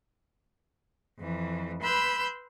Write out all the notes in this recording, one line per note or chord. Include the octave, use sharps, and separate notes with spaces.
F2 E3
B4 B5 C6 E6 G6